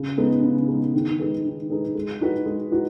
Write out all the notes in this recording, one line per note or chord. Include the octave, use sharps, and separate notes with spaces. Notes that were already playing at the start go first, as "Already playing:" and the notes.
Already playing: C#3
G#3 B3 D#4
C#3
G#3 B3 D#4
D#3
G#3 D#4 G#4 B4
D#3
G#3 D#4 G#4 B4
G#3
D#4 F#4 B4
G#3
D#4 F#4 B4